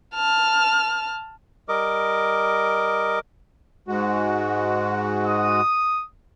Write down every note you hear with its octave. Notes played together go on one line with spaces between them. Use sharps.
A5 F6
G3 A#4 D#5 D6
G#2 G#3 F#4
D#6